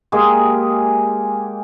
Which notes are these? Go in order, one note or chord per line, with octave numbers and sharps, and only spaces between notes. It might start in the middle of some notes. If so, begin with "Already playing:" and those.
G#3 A#3 G4 G#4